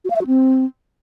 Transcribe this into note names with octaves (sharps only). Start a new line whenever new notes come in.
F#4
F5
E5
F#4
C4